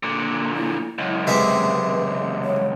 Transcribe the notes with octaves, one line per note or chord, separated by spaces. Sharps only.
A#2 D3
E4
C#2 F#2
C3 G#3 B4 E5
C#5